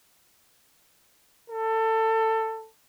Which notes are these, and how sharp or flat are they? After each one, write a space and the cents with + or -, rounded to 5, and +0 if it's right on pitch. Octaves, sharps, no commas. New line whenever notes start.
A4 +20